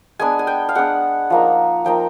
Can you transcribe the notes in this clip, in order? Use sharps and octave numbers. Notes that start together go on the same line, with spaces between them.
G#3 B3 D4 G#5
G#5
G5
F5
G#3 B3 D4 F#5
F3 A#3 D#4
F3 A#3 D#4 G5